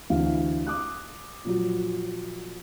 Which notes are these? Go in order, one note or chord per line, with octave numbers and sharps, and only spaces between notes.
D2 E3 F5
D6 D#6 F#6
A#2 F3 F#3